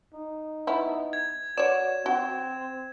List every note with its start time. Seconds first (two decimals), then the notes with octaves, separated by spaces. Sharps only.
0.14 D#4
0.67 B3 E4
1.13 G#6
1.58 F#4 C#5 D5 E7
2.06 C4 F#4